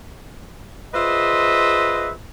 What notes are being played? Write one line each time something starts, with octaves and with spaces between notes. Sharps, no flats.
F4 G#4 B4 C5 D#5 E5